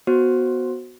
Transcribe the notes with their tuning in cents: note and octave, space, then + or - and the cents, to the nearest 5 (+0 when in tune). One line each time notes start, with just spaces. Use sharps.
B3 +0 F#4 +0 C5 +15